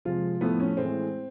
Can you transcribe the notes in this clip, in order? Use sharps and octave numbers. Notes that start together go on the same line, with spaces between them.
C3 F3 G#3 F4
A2 F3 A3 B3
C#4
A2 E3 G#3 C4